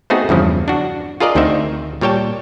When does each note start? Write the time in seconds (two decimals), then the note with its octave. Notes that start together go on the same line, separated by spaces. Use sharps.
0.10 A3 B3 C4 D#4 F#4 G#4
0.29 E2 G2 C#3 F3
0.68 D4 F#4
1.20 F4 G#4 A#4 D5 D#5
1.35 D2 D#3 C4 D#4 E5
2.01 A#2 G3 C#5 G5 A5